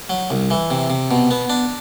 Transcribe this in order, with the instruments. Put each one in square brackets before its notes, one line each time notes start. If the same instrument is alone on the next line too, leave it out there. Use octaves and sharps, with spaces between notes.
[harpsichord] F#3
C2
E3
C3
C3
B2
B3
D4